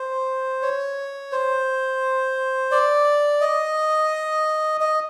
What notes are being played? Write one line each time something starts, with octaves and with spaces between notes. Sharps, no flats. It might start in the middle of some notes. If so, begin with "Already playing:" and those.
Already playing: C5
C#5
C5
D5
D#5
D#5